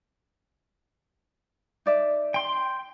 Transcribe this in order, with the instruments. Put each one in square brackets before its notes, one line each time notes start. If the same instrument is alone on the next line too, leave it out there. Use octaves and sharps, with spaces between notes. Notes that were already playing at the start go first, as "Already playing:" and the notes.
[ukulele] D#4 D5 E5
[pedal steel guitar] G5 C6